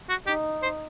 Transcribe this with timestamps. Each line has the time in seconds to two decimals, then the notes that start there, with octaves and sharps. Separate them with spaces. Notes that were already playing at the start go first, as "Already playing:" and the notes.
0.09 F#4
0.27 D#4 G4
0.63 C5